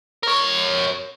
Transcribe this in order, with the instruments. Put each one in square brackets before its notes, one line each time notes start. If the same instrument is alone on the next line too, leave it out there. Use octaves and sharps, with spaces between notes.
[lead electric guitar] A#4 C#5